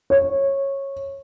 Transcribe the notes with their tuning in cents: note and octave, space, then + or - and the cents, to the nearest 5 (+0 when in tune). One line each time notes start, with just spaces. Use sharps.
C#5 -15